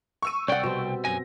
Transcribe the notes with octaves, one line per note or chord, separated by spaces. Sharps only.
C#6 E6 D#7
C2 D5 F#5 G5
B2 G3 C4
F#2 G#5 A#6